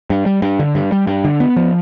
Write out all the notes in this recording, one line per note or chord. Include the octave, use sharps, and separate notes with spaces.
G2
G3
G2
D3
G2
G3
G2
D3
B3
F3